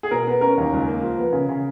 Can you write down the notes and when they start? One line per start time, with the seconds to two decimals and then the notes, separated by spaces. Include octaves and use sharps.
0.03 G#4
0.11 B2 A#4
0.27 B3
0.41 C#4 A#4
0.57 D#2
0.73 C#2
0.88 A#3
1.03 F3
1.18 B3
1.33 C#3
1.49 C#3